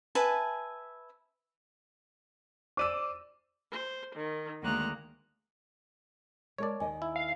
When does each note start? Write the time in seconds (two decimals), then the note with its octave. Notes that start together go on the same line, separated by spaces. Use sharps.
0.15 B4 E5 G#5 A5
2.77 C5 D5 D6 E6 D#7 E7
3.72 C5
4.15 D#3
4.62 D2 D#3 G#3 A#3 A#5 F#6
6.58 G#3 A#4 C#5 D5 A5
6.80 D#2 D#3 D#5 G#5
7.02 E4
7.16 F5